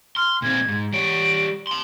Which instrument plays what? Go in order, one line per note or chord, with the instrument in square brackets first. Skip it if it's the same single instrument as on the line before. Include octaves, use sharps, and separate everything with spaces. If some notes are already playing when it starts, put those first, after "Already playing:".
[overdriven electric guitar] C6 [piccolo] F6
[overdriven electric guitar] A#2 C4 [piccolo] G#6
[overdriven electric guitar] G#2
[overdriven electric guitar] G3 C#5 [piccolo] D7
[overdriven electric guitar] A5 C6